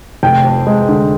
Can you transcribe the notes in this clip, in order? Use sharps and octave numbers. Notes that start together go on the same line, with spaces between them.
F1 G5
F2
G#3
D3